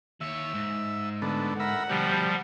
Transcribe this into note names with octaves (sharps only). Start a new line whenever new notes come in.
D#2 C#5 E5
G#2
D3 A3 B3
A#4 E5 F#5 B5
D2 B2 F3 G3 G4